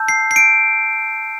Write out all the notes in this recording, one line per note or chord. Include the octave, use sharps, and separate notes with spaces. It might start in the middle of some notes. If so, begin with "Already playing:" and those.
Already playing: A5 E6 G6
C7
C7
D7